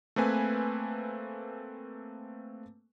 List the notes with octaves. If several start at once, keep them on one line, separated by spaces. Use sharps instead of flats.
A3 A#3 C4 B4 G#5